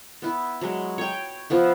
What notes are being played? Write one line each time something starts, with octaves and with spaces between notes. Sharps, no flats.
B3 E4
F#3 G#3
C#5 G5
F3 B3 E4